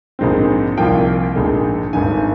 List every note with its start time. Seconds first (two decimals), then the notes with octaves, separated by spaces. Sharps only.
0.19 A#1 G#2 D#3 G#3 C4
0.77 C2 A#2 F3 G5
1.36 A#1 G#2 D#3 G#3
1.93 G#1 G2 D#3 G#5